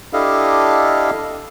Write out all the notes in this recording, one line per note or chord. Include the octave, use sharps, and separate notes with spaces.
D4 E4 G4 A4 D#5 F5